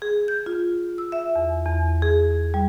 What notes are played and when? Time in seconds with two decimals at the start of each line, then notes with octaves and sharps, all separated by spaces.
0.02 G#4
0.28 G6
0.46 F4
0.98 E6
1.12 E5
1.36 E2
1.66 E2
2.02 G#4
2.54 G3